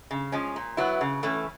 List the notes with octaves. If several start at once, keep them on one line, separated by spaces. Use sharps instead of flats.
C#3
F3 G#3 C#4
A#2
F#3 B3 E4
C#3
E3 A3 C#4